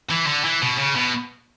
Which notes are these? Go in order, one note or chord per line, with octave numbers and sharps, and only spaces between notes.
E3
D3
E3
B2
C#3
B2